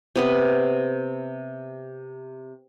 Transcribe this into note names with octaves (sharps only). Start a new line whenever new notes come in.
C3 B3 B4